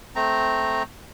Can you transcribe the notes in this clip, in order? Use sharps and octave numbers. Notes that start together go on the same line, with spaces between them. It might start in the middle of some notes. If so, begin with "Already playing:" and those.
A3 C4 A#5